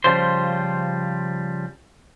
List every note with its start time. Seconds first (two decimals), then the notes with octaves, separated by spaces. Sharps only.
0.04 C#3 F3 G3 F4 C5